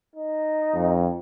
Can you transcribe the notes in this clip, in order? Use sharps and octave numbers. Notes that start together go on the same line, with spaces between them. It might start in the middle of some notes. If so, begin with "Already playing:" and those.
D#4
F2